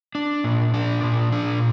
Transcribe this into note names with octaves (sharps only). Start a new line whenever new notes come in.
D4
A#2
D4
A#2
D4